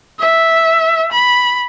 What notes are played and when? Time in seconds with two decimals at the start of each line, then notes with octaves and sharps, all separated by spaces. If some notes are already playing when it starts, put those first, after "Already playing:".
0.19 E5
1.11 B5